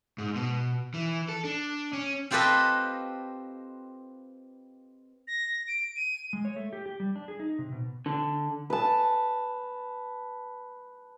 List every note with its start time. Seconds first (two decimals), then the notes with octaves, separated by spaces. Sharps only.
0.18 G#2
0.36 B2
0.94 E3
1.28 A4
1.45 D4
1.93 C#4
2.31 C4 F4 G4 A4 B4 D#5
5.28 A#6
5.68 D7
5.96 D#7
6.33 G#3
6.45 C#5
6.56 A3
6.73 G4
6.86 G4
7.00 G3
7.16 D4
7.28 G#4
7.40 D#4
7.59 C3
7.72 B2
8.06 D3
8.70 B4 A5